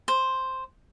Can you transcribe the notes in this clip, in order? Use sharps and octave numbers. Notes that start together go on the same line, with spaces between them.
C5